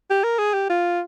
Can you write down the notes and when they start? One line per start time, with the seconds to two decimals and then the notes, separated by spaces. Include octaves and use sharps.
0.10 G4
0.24 A#4
0.39 G#4
0.54 G4
0.70 F4